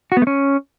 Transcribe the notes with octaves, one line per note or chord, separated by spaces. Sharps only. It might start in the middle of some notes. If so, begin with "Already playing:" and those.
F#4
B3
A3
C#4